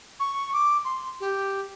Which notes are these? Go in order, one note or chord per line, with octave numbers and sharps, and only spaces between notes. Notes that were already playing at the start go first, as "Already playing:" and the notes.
C#6
D6
C6
G4